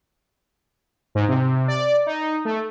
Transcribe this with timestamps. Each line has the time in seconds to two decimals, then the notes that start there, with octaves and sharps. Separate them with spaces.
1.15 G#2
1.29 C3
1.68 D5
2.06 D#4
2.45 A3